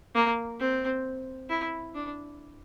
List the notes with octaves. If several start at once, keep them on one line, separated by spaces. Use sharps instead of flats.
A#3
C4
E4
D4